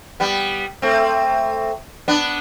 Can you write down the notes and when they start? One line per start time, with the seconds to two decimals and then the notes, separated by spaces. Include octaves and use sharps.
0.20 G3 B3
0.82 A3 C4
2.08 B3 D4